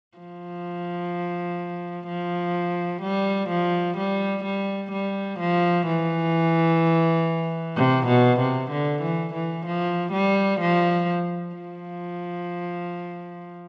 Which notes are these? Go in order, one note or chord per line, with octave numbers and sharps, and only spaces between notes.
F3
F3
G3
F3
G3
G3
G3
F3
E3
C3
B2
C3
D3
E3
E3
F3
G3
F3
F3